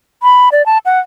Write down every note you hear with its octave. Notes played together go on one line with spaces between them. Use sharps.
B5
D5
A5
F#5